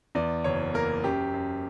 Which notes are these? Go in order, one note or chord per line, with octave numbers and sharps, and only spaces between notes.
E2 D5
F#1 C#5
A#3 A#4
F#2 G4
F#2